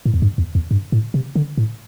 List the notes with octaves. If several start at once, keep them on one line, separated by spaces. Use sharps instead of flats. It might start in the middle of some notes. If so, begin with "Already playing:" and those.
A2
E2
G2
E2
E2
G2
A2
C3
D3
A2